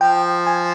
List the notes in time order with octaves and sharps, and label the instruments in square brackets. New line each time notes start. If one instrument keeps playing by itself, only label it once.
[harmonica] F3 [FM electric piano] G5
[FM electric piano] G#5